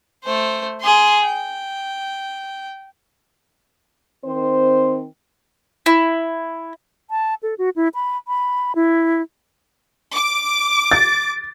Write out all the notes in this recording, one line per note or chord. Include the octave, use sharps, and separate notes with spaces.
A3 C5
G#4 C6
G5
D#3 C4 C5
E4
A5
A4
F#4
E4
B5
B5
E4
D6
A6